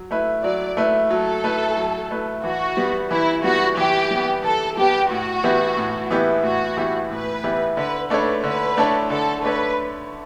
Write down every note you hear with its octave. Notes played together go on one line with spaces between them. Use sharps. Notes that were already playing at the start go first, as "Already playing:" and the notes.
Already playing: F#3
A3 E4 B4
F#3 D5
A3 E4 B4
F#3 A4
A3 E4 B4
F#3
A3 E4 B4
E3 F#4
G3 B3
E3 E4
G3 B3 F#4
E3 G4
G3 B3
E3 A4
G3 B3 G4
A2 F#4
E3 B3 E4 G4
A2
E3 B3 E4 G4
A2 F#4
E3 B3 E4 G4
A2 B4
E3 B3 E4 G4
D3 B4
A3 D4 A4 B4 C#5
D3 B4
A3 D4 A4 C#5
D3 A4
A3 D4 A4 B4 C#5